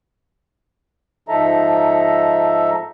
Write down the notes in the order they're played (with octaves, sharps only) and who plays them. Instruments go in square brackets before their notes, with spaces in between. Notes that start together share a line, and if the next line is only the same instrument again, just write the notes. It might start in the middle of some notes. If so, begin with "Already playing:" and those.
[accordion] G#2 F3 D#4 A4 E5 A#5